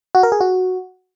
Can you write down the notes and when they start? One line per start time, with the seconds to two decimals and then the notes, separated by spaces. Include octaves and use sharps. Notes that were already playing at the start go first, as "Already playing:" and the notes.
0.15 F#4
0.23 A#4
0.32 G#4
0.41 F#4